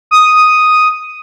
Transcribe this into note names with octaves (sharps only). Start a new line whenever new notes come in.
D#6